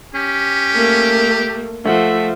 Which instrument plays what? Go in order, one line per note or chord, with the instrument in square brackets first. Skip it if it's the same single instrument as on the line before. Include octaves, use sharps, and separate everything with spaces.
[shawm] C#4 [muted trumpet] G4
[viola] A3 A#3
[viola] F3 [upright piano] A3 F#5 [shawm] E5